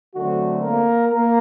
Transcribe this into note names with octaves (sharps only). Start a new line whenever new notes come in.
D3 F#3 A3 C4 F#4
A#3 A#4
A#3 A#4